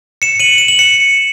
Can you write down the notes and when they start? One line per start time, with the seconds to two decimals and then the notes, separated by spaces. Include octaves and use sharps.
0.22 C#7 E7
0.40 D#7 F#7
0.58 E7
0.68 F#7
0.79 C#7 E7